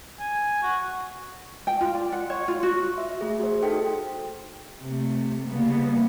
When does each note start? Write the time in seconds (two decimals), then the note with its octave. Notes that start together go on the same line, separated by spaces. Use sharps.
0.20 G#5
0.63 F#4
1.67 G5
1.81 F4
1.94 D5
2.12 F#5
2.30 C#5
2.48 F4
2.63 F#4
2.98 E5
3.21 A3 G#4
3.39 F#4 C5
3.62 D#4 F#4 A4 G5
4.84 C3 A3
5.46 C#3 G3 A#3 B3